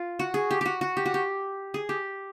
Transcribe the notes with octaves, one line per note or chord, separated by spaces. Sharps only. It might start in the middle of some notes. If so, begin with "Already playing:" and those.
Already playing: F4
F#4
G#4
G4
F#4 G4
F#4
G4
F#4
G4
G#4
G4